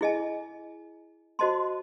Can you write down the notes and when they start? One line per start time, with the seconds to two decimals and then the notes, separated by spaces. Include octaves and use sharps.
0.01 E4 G#4 D#5 G#5
1.39 F#4 C5 D#5 A5 C6